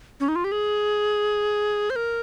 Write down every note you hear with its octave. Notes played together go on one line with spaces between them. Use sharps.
C#4
D#4
F4
G4
G#4
C5
A#4